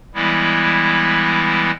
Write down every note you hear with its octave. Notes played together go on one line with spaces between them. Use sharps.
E3 G3 G#3 B3 E4